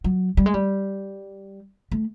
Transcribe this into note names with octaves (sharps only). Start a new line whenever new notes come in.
F#3
G3
G#3
G3
A3